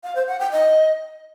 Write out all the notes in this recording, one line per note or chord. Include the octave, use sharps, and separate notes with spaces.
F5
C5
F#5
G5
D#5